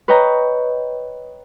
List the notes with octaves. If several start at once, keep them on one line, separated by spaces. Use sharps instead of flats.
B4 C#5 D#5 G5 A#5